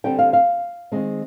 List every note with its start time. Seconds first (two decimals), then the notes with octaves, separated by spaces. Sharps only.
0.04 D3 G3 C4 G5
0.19 F5
0.33 F5
0.92 D#3 G#3 C4